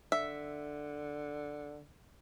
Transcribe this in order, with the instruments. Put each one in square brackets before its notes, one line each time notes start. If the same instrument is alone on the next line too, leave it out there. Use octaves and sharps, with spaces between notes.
[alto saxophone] D3 [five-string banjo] E5